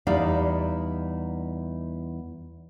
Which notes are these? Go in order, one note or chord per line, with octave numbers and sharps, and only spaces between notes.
E2 G3 D#4 E4 D5 F5